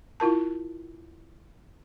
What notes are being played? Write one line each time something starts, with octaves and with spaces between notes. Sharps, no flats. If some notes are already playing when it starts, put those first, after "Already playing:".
E4 F4 A#4 A5